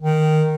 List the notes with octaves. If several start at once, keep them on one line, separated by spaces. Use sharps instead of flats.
D#3